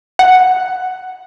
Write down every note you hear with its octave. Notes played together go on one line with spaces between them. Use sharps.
F#5